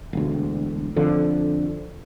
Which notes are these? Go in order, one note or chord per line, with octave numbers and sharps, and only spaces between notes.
E1 D2
F2 D3 F3